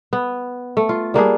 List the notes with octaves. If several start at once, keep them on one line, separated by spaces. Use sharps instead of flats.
B3
A3
F4
G3 A#3 D4 G#4